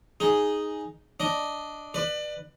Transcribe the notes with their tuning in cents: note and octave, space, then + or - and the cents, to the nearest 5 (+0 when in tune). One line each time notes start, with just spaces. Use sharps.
D#4 +0 G#4 +0
D4 +0 D#5 +5
B4 +0 D5 +30